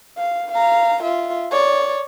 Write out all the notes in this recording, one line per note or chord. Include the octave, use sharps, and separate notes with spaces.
F5
F5 A#5
F4 E5
C#5 D5